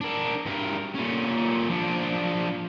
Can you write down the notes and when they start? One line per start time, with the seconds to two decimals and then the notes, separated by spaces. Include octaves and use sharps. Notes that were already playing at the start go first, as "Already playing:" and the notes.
0.01 D4 A#4
0.46 G2 A#4
0.95 A#2 C#4
1.69 F3 D4